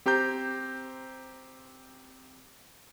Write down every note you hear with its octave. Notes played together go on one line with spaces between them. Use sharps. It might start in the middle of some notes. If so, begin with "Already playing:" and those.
C4 G4 C5 A#5 G6